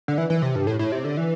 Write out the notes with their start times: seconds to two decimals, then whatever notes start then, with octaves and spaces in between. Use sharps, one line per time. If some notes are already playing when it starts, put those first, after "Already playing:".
0.08 D3
0.18 E3
0.30 E3
0.42 C3
0.55 G2
0.67 A2
0.79 A2
0.92 C3
1.04 D3
1.17 E3